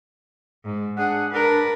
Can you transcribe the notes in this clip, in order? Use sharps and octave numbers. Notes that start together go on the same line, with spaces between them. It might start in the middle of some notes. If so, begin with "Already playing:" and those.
G#2
D4 G#4 F#5
D4 A#4 B4